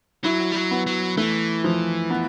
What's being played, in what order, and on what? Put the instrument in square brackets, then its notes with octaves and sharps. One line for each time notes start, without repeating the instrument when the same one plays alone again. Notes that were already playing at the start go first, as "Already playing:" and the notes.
[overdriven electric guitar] F#3 [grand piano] E4
[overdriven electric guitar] G3
F#3
[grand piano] B3
[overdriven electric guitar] F#3
[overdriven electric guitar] E3 [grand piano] A3
[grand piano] F3
B3